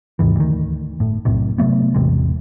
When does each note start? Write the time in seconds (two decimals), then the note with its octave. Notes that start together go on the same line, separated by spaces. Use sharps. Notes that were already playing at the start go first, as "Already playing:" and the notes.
0.19 D#2 G#2 C3 E3
0.36 D2 D#3
1.00 G1 A2
1.25 B1 F#2 A2 C3
1.58 C3 F#3 A3 B3
1.94 A1 E2 C3 G#3